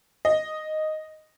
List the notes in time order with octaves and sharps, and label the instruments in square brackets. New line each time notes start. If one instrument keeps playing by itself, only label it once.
[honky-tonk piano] D#5